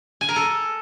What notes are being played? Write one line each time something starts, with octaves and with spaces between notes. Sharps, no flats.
G#5
A#4
A4